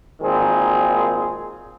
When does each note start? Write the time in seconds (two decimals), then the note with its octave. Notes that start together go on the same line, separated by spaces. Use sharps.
0.21 G#1 A#2 D#3 C4 G#4